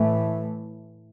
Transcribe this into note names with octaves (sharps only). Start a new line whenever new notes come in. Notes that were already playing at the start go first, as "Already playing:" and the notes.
Already playing: A2 E3 A3